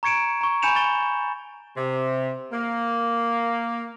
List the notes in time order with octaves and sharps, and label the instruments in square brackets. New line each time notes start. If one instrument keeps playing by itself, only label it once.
[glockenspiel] A#5 C#6 G#6 C#7 D7 E7
A#5 C#6
G#5 B5 G6 C#7 E7 F7
C#6 A6 G7
[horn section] C3
A#3